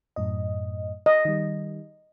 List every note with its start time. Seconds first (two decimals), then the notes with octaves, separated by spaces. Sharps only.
0.16 F#2 A2 D#5
1.06 D#5
1.25 D#3 G3